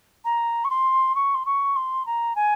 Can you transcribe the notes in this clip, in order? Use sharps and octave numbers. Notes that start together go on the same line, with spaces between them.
A#5
C#6
C6
C#6
C6
C#6
C6
A#5
G#5